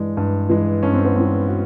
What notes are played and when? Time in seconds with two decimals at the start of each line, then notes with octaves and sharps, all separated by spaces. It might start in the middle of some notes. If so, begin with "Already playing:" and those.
Already playing: G2 E3 G#3 D4
0.17 G2
0.50 E3 G#3
0.83 G2 C#4
0.94 C4
1.05 B3
1.16 E3 G#3 C4
1.49 F#4